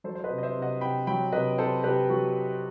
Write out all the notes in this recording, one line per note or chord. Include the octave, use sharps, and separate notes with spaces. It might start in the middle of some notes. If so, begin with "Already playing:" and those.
F#3 A4 C5
C5
B4 D#5
C3
D#5
C5 E5
C3
D#5 F#5
C3 G5 B5
F#3 G5 B5
C3 B4 D#5
C3 A4 C5
C3 G4 B4
F#3 F#4 A4